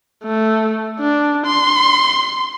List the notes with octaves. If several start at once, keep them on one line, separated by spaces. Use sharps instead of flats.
A3
D4
C6